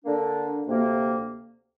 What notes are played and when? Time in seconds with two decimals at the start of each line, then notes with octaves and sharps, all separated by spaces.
0.05 D3 A#3 D4
0.66 D2 C3 A#3